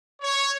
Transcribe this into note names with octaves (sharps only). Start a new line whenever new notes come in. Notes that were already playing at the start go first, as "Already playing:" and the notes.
C#5